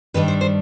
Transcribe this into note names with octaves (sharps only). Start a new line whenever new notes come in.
G2 D#3 G3 D4 B4
C5
C5